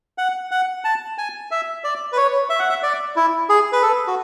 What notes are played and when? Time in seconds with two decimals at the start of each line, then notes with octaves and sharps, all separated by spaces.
0.18 F#5
0.51 F#5
0.84 A5
1.18 G#5
1.51 E5
1.84 D5
2.12 B4
2.17 C#5
2.50 E5
2.59 F#5
2.69 E5
2.83 D5
3.16 E4
3.49 G#4
3.73 B4
3.82 A4
4.08 F#4